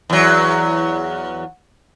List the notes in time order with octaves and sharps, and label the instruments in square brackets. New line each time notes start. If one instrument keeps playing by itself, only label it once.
[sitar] E2 F#3